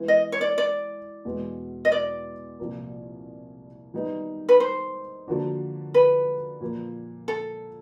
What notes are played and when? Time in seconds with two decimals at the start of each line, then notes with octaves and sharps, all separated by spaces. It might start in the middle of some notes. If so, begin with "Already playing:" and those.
Already playing: E3 G#3 B3
0.08 D#5
0.32 C#5
0.41 D5
0.58 D5
1.25 E2 B2 G#3 B3
1.85 D#5
1.92 D5
2.59 C2 A#2 F3 A#3
3.94 D#3 G3 B3 D#4
4.49 B4
4.60 C5
5.28 D3 F3 A#3 D4 F#4
5.94 B4
6.61 A#2 F3 A#3
7.28 A4